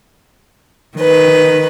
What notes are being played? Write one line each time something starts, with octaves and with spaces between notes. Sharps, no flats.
D#3 B4